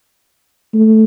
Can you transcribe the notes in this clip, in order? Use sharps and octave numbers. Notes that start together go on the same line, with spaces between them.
A3